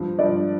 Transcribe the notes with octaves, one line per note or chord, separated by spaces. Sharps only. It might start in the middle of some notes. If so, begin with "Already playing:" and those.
Already playing: G2 F3 C5
G2 F3 D5